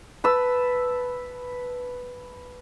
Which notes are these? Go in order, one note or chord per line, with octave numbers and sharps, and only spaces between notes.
B4 A5 E6